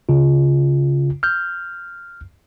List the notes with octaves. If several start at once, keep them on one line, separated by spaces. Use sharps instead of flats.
C#3 F4
F6 G6